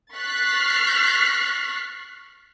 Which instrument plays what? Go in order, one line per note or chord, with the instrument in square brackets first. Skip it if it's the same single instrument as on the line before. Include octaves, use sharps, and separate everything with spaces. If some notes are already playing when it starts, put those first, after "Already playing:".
[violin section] C#6 F6 F#6 A6 B6 C7